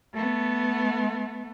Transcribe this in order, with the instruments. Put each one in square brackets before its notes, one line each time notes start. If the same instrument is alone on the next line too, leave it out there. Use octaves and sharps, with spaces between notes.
[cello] A3 B3